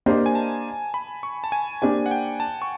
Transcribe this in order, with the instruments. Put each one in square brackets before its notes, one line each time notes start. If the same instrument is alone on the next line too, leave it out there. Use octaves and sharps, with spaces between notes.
[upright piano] A#3 D4 G4 C5 D#5
[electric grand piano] G#5
A5
B5
C#6
A5
G#5
[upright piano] A#3 D4 G4 C5 [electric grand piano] G#5
[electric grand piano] F#5
G5
A5
C#6